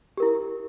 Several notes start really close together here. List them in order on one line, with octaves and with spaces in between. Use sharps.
G4 A#4 E4